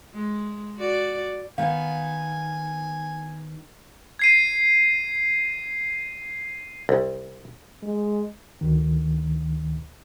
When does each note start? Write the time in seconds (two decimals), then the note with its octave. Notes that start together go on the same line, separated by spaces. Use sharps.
0.14 G#3
0.78 F#4 D5
1.58 D#3 B3 F5 G#5
4.19 G#6 C7 D#7
6.89 C2
7.83 G#3
8.61 D2 D#3